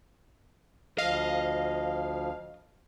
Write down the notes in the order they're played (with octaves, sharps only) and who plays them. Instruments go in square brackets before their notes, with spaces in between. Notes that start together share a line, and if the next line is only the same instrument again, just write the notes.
[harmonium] D2 F3 [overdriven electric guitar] D#5 [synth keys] F5